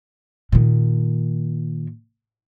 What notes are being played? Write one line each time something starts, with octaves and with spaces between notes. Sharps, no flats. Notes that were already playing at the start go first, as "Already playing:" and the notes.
A#2 D#3